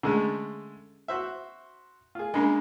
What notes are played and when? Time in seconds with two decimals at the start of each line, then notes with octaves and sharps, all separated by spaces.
0.03 D3 G#3 A3 C#4 G#4
1.08 F#4 C5 E5
2.15 F4 G#4
2.34 G#3 A#3 C#4 D4 G#5